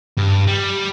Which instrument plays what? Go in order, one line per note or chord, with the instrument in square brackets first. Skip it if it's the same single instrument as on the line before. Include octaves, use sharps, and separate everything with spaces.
[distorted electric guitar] G2
G3